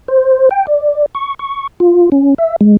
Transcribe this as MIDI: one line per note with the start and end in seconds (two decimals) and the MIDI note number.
0.08 0.49 72
0.51 0.66 79
0.67 1.06 74
1.15 1.34 85
1.39 1.67 85
1.80 2.10 65
2.12 2.34 61
2.38 2.56 76
2.61 2.77 56